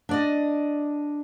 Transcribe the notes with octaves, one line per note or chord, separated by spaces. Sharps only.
D4 D5 D#5